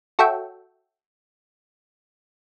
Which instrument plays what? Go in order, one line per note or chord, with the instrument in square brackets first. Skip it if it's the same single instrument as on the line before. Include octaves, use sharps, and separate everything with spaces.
[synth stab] F#4 A4 C#5 E5 G5